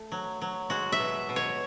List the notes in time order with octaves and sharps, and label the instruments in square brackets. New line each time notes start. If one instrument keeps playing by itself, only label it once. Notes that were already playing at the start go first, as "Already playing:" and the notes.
Already playing: [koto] A3
F#3
F#3
G#3 F#4
E5
B2
B2
C#5